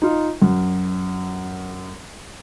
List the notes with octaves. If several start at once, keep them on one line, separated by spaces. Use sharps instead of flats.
D#4 F4
F#2